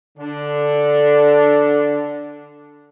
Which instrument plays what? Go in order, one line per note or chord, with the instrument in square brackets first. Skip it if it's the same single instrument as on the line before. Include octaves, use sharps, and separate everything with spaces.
[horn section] D3 D4